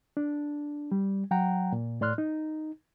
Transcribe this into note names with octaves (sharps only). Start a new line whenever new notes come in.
D4
G3
F#3 F#5 G5 A#5
A#2
A2 D5 C6 F6 F#6
D#4